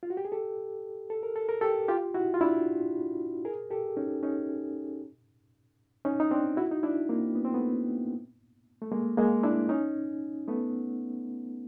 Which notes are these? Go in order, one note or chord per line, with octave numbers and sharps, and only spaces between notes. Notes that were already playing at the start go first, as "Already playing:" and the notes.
F4
F#4
G4
G#4
G4 A4
A4
A#4
A4
A#4
G4 A4
F4 G4
E4 F#4
F4
D4 E4
G#4 A#4
G4 A4
C#4 D#4
C#4 D#4
C#4 D#4
D#4
C4 D4
E4 F#4
D#4
D4 E4
A#3 C4
B3
C4
A3 B3
A3
G#3 A#3
G#3 A#3
D4 E4
C#4 D#4
A3 B3